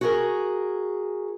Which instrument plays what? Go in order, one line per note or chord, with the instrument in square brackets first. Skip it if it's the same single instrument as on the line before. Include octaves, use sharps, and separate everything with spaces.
[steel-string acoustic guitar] F#4 G#4 A#4